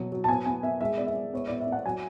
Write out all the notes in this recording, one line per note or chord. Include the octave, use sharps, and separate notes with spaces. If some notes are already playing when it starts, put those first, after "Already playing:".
Already playing: B2 F#3
F#3
A5
B3 G#5
B3 G#5
B3 E5
G#3 E5
B3 D5
E5
G#3
B3 C#5
B3 D5
E5
B3
F#5
F#3 G#5